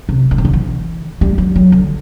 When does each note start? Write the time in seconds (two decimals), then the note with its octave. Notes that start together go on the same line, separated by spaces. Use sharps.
0.09 C3
0.31 D3
0.38 C3
0.45 D3
0.53 E3
1.21 G3
1.38 F#3
1.56 F#3
1.72 D3